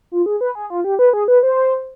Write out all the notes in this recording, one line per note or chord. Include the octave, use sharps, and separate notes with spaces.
F4
G#4
B4
G#4
F4
G4
B4
G#4
B4
C5